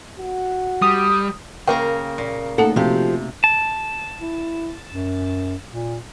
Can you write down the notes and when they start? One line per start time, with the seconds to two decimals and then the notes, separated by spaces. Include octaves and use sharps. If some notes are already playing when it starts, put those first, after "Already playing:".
0.19 F#4
0.82 G3 D#6
1.67 C#3 A#3 A#4 G5 A#5
2.18 A#2
2.58 A3 A#3 D#4 A4 F#5
2.76 C3 F3 F#4 G4 F5
3.44 A5
4.21 E4
4.91 F#2
5.71 A#2